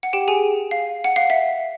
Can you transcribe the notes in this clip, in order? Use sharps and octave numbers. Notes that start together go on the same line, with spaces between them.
F#5
G4 G5
G#4 G#5
F5
F#5
F5
E5